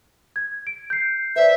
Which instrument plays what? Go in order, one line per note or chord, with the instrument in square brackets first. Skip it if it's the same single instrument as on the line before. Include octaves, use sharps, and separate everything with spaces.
[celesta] G#6
D7
G6 C7
[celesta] B4 C5 D5 [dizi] E5